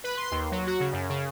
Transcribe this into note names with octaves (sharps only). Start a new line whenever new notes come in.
B4
C6
D#2
F#3
F#4
C#3
F#2
C#3